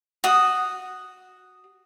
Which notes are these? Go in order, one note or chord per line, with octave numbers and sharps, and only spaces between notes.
F#4 D#6